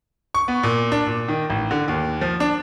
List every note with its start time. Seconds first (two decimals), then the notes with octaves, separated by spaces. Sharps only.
0.34 C#6
0.48 B3
0.63 A#2
0.92 D4
1.07 A#2
1.28 D#3
1.50 A1
1.71 D3
1.88 D#2
2.21 F3
2.40 D4